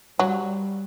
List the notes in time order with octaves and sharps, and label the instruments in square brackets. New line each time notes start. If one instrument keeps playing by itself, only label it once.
[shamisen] F#3 [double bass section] G3